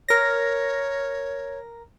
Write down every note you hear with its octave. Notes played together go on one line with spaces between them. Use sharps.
A#4 C#5 A#6